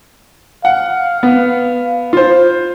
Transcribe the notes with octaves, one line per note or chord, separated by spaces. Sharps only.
F5 F#5
B3
F4 C5